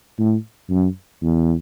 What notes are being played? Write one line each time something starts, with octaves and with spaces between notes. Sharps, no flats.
A2
F#2
E2